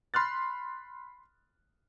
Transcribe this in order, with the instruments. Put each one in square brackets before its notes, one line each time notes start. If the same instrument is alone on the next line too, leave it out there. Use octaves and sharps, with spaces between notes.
[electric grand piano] B5 C6 F6 F#6 A6